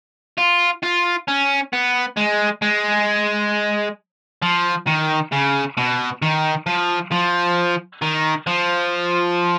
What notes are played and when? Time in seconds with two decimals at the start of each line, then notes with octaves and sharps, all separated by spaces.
0.38 F4
0.83 F4
1.28 C#4
1.73 B3
2.17 G#3
2.62 G#3
4.42 F3
4.87 D#3
5.32 C#3
5.77 B2
6.22 D#3
6.66 F3
7.12 F3
8.02 D#3
8.47 F3